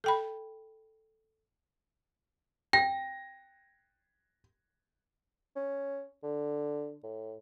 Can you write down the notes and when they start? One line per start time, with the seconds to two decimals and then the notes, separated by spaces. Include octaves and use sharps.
0.04 A4 G5 B5
2.73 G5 A#6
5.56 C#4
6.23 D3
7.03 A2